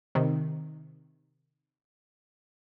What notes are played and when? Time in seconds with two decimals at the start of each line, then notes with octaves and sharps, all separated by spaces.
0.15 C3 D#3